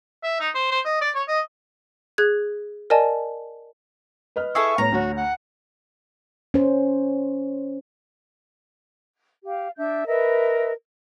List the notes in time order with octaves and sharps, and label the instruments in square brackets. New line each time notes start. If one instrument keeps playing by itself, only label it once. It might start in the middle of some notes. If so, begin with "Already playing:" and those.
[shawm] E5
D#4
C5
C5
D#5
D5
C#5
D#5
[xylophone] G#4 F#6 G#6
A#4 D5 D#5 G#5 A5
[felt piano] B4 D#5 F6
[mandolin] E4 G#4 A4 [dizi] C#6
[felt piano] A2 B3 C#5 [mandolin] A#5
[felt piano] D2 C#5 [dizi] F#4
[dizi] F#5
[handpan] C#4 C5
[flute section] G4 F5
D4 E5 G6
A#4 B4 D#5 E5